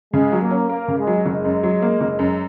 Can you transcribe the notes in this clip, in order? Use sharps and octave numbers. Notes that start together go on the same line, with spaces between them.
C#3 G#3
F#3
A#3
C#4
A#3 A#4
C#3
G#3
F#3
F#1 G#3
F#2
F#3
A#3
F#1
F#2